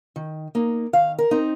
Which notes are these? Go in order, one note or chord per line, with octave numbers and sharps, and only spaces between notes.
D#3
A#3 D#4
D#3 F5
A#4
C4 D#4